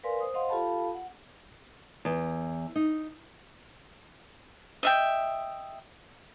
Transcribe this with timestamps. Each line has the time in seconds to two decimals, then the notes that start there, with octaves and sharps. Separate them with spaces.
0.03 A#4 B4 D5 F5 G#5 C6
0.20 C5 D#6
0.34 C5 D#5 F5 F#5 C6
0.49 F4 G4 A4 F5 A5 B5
0.94 F#5
2.05 E2
2.76 D#4
4.83 D#5 E5 G5